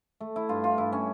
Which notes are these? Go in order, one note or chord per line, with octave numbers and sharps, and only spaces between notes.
A3
E4
G2 F4
F4
G2 E4
C#4